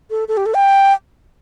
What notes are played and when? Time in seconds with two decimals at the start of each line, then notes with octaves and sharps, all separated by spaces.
0.11 A4
0.28 A4
0.37 G4
0.46 A4
0.54 G5